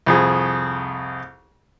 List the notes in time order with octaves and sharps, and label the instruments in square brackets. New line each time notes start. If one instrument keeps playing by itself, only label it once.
[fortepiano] C2 F2 G#4